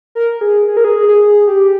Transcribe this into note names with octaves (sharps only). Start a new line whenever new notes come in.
A#4
G#4
G#4
A#4
G#4
G#4
G4